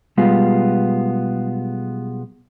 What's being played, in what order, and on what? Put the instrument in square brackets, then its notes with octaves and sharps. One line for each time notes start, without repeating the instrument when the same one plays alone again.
[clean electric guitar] B1 G3 G#3 B3 F4